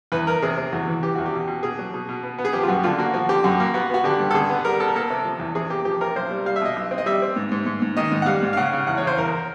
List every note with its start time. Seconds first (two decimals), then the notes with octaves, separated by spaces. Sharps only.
0.12 E2 B4
0.27 E2 A#4
0.42 C3 G#4
0.57 C3
0.73 E2 F#4
0.87 E3
1.03 E3 G4
1.15 E2 F#4
1.26 G4
1.33 B2
1.48 B2
1.63 B2 G#4
1.79 F#3
1.94 B2
2.09 B2
2.23 B3
2.38 B3
2.45 G#4
2.53 F3 G4
2.63 F4
2.68 F#2 F#4
2.84 D3 F4
2.98 A#3 F#4
3.14 F3 F#4
3.29 D3 G4
3.44 F#2 F#4
3.60 A#3
3.74 B3 F#4
3.90 B3 F#4
4.04 D3 G4
4.20 G2
4.31 A4
4.34 D3 G#4
4.49 B3
4.64 G3 A#4
4.80 B3 A4
4.88 A#4
4.95 A#3 A4
5.10 C3
5.25 F3
5.40 E2
5.55 C3 G#4
5.70 A#3 G4
5.85 F3 G4
6.01 C3 A#4
6.16 B1 C5
6.31 G3
6.46 G3 F5
6.56 E5
6.62 B2 D#5
6.76 B1
6.91 C4
6.98 D#5
7.06 G3 E5
7.22 C4
7.36 G#2
7.52 G#2
7.66 G#2
7.82 G#2
7.97 D#3 D#5
8.12 G#2
8.22 F#5
8.26 G3 F5
8.42 G#2
8.53 F5
8.57 C#3 F#5
8.73 C#3
8.87 E2 F#5
8.97 C#5
9.02 C#3
9.07 C5
9.17 E2 A#4